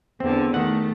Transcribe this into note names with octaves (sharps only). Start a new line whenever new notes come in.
E2 D3 C4
D#3 A3 F#5